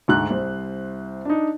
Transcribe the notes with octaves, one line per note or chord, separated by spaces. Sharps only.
D2 G#2 F#6
C2 C5
D4 D#4